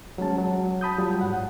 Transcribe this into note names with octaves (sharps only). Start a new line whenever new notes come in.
F#3 G#3 C#4 A5
F#3
A5 B5 D#6 G6
F#3 G3 F4
G#2 F#5